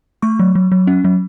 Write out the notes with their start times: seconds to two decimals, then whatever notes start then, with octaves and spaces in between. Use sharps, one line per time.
0.22 A3 C#6
0.39 F#3
0.55 F#3
0.72 F#3
0.87 C#4
1.04 F#3